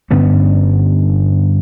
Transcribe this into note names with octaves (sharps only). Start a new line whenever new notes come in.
G2 D3 B3 C#4